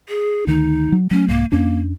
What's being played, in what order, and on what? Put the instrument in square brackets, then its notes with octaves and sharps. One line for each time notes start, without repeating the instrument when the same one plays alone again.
[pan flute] G#4
[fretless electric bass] D2 D#3 [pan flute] D#4
[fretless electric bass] F#3
[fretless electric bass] F#3 A3 [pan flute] C#4
[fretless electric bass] C2 G#2 [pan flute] A#3
[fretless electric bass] F2 C#4 D4 [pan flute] A#3